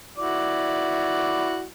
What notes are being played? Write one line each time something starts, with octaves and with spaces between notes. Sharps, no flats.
E4 F#4 D5